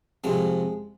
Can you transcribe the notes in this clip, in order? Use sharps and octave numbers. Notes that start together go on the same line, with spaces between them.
F2 C3 F3 G#3